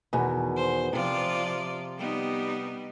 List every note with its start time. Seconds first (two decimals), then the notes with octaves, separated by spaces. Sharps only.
0.13 E2 B2 D#3
0.57 C5
0.93 C3 F3 F4 D5
1.98 G3 B3 D#4